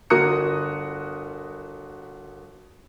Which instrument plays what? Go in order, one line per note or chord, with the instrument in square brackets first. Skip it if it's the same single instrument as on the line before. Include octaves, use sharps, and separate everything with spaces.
[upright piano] G1 F#4 A#4 D#6 C#7